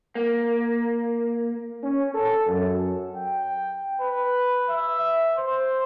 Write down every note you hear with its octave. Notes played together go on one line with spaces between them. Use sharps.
A#3
C#4
A4
F#2
G5
B4
E5
C5